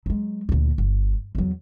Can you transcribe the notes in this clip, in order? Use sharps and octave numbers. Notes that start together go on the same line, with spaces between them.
F#3 G#3
D2 A#2
G1
E2 F#3